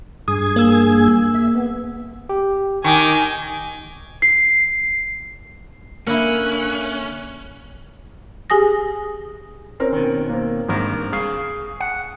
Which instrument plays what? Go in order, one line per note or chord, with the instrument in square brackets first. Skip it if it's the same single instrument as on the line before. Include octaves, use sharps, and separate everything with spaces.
[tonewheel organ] G2 G#4 G#6 [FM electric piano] D#6
[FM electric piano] A#3 E6
[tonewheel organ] E5
B3
[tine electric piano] G4
[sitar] D#3 [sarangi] G#5 [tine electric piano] C#6 D6
[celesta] C7
[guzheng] D3 E4 [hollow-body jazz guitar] A#3 [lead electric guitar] C#4 [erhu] F#6
[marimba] G4 G#4 G#5 D#6 A#6
[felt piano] C4 C#4 A#4
[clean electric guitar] B2 D#3
[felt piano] A#3 C4
[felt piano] G#1 [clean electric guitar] G2 A#4
[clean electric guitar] G#4 F5 [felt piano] C#6
[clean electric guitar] F#5